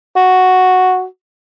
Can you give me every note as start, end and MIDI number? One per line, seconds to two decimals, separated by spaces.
0.16 1.06 66